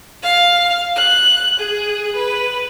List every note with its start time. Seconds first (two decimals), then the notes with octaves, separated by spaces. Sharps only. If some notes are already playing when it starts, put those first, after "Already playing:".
0.21 F5
0.96 F#6
1.59 G#4
2.15 B4